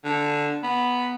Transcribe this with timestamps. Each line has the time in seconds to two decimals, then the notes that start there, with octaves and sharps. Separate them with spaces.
0.05 D3
0.63 B3